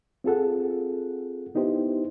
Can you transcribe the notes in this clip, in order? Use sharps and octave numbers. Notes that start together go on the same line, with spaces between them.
C4 F4 G#4 A4 F#5
B3 D#4 E4 G4 C5